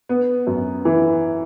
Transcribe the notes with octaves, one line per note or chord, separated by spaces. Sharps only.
B3
F#2
E3